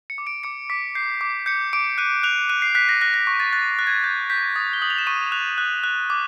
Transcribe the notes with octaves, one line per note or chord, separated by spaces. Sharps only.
C#7
D6
D7
D6 C#7
D6 B6
G6 C7
D6
G6 C#7
D6 D7
F#6 D#7
F#6 F7
F#6 D#7
C7
F#6 B6
A#6
F#6 A#6
A#6
C#6
A6
F#6 A6
F#6
G#6
G6 A6
G6 B6
D#6 A6
G7
D#6 F#7
F7
E7
C#6 D#7
F#6 F7
F#6
F#6
D6